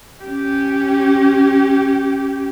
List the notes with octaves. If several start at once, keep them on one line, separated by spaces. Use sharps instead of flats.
C#4 G4